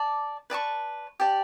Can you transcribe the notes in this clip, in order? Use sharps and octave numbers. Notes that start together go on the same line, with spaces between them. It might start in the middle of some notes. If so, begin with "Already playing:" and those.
Already playing: D5 A5 D6
B4 D5 A5 C#6
G4 D5 A5